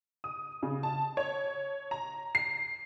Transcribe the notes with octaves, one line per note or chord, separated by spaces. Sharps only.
D#6
C#3
A5
C#5
A#5
C7